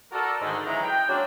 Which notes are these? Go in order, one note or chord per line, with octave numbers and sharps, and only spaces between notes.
F#4 A4 A#4 D5
G#2 D3 D#3 A3
C#3 E3 F#3 G#3 A#5
G5
C#3 F#3 G#3 A#3 D4